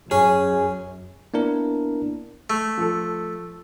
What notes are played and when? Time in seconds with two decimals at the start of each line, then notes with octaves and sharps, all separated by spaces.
0.11 F#2 C#4 G#4
1.34 A#3 B3 D4 E4 A#4
2.50 A3
2.78 F3 A4